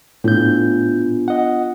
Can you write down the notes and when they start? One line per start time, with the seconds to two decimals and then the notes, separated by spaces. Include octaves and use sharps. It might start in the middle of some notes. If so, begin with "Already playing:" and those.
0.24 A2 B3 D4 F4 G6
1.28 D#5 F#5